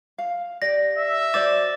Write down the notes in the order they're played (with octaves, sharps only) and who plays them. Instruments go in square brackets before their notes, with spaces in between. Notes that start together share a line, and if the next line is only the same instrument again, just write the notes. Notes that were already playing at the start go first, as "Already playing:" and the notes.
[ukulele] F5
[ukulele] G4 D5 [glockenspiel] A#6
[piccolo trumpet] E5
[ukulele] F#4 C5 D5 [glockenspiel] D6 A6 E7